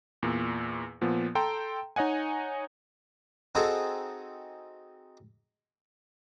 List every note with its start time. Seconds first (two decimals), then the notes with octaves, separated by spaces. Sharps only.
0.23 E2 A#2
1.01 A#2 F3 B3
1.35 A4 G5 A#5 C6
1.96 D#4 C#5 D#5 F#5 G#5
3.55 C4 D#4 F#4 G#4 A4